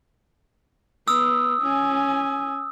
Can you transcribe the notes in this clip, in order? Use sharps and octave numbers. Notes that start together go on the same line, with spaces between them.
B3 D#6 E6
C#4 G#5